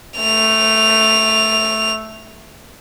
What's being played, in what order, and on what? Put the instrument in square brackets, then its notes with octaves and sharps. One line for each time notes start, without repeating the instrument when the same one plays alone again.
[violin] A3 F7